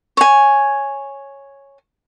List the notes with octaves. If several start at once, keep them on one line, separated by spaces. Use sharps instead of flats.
C#5 G#5